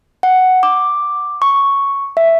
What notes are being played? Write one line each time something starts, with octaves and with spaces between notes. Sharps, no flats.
F#5
D6
C#6
E5